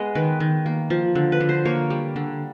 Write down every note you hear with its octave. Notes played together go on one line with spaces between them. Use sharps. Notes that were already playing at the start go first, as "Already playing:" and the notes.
Already playing: G#3 B3 D#5
D#3 B4
D#3
A#3
F3
D3
B4
D3
C5
A#3 C#5
G3
D3